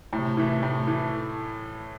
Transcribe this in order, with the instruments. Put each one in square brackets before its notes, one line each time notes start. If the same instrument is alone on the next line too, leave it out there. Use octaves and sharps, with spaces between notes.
[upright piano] A2 [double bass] C3
[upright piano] E3 A3
A2
E3 A3